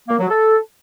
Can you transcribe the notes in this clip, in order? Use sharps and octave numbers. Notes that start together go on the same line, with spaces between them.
A#3
F#3
A4